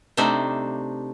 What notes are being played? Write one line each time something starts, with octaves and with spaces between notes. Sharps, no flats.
C3 A3 D4 D#4 C5 E5